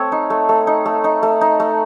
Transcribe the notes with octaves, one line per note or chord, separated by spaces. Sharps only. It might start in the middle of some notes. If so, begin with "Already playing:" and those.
Already playing: A3 C4 C#5 E5 F#5
D#4
A3
A3
D#4
A3
D#4
A3
D#4
A3